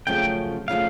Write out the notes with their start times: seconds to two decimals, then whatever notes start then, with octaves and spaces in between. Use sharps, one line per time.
0.07 F#2 C#3 F3 A3 G5
0.68 C#3 F3 A3 F5